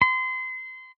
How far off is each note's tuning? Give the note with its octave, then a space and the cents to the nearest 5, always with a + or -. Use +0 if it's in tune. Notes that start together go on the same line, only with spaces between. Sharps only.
C6 -30